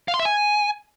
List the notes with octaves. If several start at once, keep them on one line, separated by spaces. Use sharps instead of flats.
F5
C6
E5
G#5